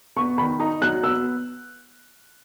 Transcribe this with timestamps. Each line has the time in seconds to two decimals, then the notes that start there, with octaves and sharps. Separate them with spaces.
0.16 B3 C#6
0.37 D#3 B5
0.60 D#4 A#5
0.81 F#3 F#6
1.03 B3 E6